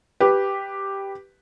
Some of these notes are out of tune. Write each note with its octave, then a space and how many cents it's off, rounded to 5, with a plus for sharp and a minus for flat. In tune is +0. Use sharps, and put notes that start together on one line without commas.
G4 +0 B4 +0